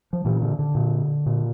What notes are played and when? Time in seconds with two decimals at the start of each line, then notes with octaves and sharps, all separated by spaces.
0.13 F3
0.25 A#2 E3
0.42 D3
0.59 D3
0.75 A#2
1.26 A#2